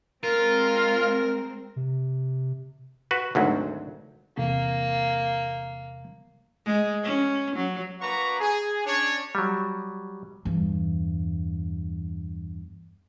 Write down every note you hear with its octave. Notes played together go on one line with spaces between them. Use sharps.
G#3 C4 F4 A#4
C3
F#4 B4
G#1 D2 F#3
E2 C3 A#3
G#3
C#4
F#3
A#3 D4 F#4 B4 A#5 C#6
G#4
C#4 D4 C#5
F#3 G3
E2 G2